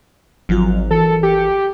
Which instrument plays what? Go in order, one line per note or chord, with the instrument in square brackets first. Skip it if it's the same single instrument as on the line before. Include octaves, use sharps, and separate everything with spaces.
[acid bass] G#1 [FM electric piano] F3 F#3 F4
[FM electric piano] E3 C#7 [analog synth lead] A4
[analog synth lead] G4